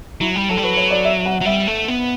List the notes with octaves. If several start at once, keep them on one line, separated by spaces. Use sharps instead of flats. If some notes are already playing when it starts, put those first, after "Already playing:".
F#3 E4
G3
F#3 A4
G3
F#3 B4
C#5
D5
E5
F#5
F#3
G3 E5
A3
B3